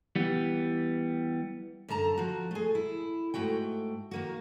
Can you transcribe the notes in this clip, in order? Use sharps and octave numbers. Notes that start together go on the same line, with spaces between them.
E3 G3 B3
F#2 D3 A5 A#5
F3 F#4
A3 G#4
E4
G#2 A3 F#4 G5
D#3 A#3 F#4